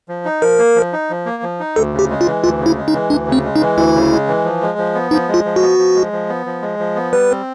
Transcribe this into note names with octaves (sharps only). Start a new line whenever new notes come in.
F3
D#4
F3 A#4
A#3
F3
D#4
F3
A#3
F3
D#4
D2 A4
C#3
G4
G#3
F4
E3
D2 F4
C#3
E4
G#3
D#4
E3
D2 D4
C#3
C4
G#3
D#4
E3
D2 E4
C#3
G#3
E3
F3
G#3
F3
B3
F3 D#4
G#3
F4
F3
F#4
B3
F3
G#3
F3
B3
F3
G#3
F3
B3
G3 B4
C4